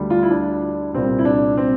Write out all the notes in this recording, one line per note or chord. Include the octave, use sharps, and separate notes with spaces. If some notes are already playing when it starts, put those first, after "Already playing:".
Already playing: D2 D3 G3
F4
E4
D4
C2 A#2 G3 C4
E4
D4
C4